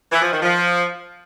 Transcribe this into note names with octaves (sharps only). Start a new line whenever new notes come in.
E3
F3
D#3
F3